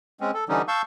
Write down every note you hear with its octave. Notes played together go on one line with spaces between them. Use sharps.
G#3 C4 C#4
A4
D3 E3 G3 C#4 D#4
F5 A5 C#6 E6 G6